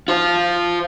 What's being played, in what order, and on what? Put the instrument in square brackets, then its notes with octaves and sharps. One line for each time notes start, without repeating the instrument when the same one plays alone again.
[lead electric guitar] F4 C5